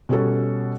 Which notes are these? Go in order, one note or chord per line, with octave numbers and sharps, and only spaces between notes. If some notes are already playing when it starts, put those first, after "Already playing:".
B2 G3 C#4 F#4 A4